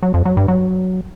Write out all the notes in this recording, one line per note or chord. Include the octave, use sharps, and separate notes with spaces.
F#3
F2
F#3
G2
F#3